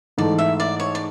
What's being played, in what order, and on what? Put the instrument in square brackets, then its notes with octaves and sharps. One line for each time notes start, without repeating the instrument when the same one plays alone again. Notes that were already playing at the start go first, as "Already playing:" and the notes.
[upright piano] G#2 E3 A3 [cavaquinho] D5
[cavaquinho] E5
D5
C#5
D5